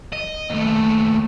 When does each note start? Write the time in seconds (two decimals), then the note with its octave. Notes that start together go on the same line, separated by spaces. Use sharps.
0.12 D#5
0.50 D#2 A3